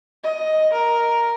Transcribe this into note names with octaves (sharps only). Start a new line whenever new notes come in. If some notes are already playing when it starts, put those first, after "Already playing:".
D#5
A#4